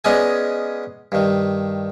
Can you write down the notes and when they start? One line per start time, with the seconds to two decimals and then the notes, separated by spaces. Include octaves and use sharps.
0.04 G#3 B3 C#4 D5 D#5 G#5
1.12 G2 D#3